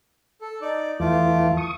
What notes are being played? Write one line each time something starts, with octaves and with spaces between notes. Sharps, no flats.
A4
D#4 D5 D6
E2 E3 A3 F4 D6
C#6 D#6